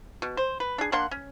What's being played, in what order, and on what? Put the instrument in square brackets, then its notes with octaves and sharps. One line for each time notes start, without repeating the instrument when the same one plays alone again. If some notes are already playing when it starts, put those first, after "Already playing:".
[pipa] B2
C5
B4
D4 G#4
A#3 D4 F#5 C6
C#4